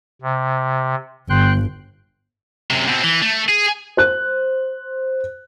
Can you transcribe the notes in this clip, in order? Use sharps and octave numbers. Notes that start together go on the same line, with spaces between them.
C3
G1 G5 C6 F#6
F#2 C3
B2 C4
E3
A3
G#4
C5 F#6